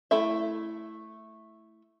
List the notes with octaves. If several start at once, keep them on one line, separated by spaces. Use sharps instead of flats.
A3 E4 A4 E5